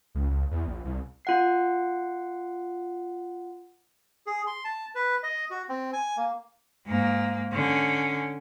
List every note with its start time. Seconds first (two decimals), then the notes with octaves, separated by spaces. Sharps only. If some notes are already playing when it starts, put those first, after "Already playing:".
0.15 C#2
0.30 C#2
0.51 E2
0.67 A#1
0.85 C2
1.25 F4 F#5 C7
4.26 G#4
4.47 C6
4.64 A5
4.95 B4
5.23 D#5
5.51 F#4
5.69 C4
5.93 G#5
6.17 A#3
6.86 G#2 A#3
7.52 D3 C#4